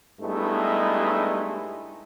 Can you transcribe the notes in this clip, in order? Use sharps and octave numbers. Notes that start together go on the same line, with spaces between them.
G2 G#3 A3 B3 D#4 E4